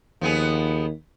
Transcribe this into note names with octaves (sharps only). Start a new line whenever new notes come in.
D#2 F3 B3 G#4